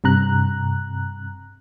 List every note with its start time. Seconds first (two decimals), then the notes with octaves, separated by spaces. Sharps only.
0.04 G2 C3 A#5 F#6